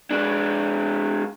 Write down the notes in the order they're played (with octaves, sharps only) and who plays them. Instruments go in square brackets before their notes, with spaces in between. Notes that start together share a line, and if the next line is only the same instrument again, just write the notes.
[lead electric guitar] G#3 D4